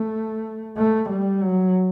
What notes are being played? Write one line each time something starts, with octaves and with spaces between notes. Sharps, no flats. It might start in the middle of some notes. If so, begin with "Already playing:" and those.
Already playing: A3
A3
G3
F#3